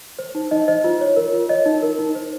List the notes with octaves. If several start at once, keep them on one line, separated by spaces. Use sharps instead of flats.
C5
D#4
D#4 D#5
C5 D#5
F4
C#5
A#4
F4
C#5 D#5
D#4
A#4
D#4
C5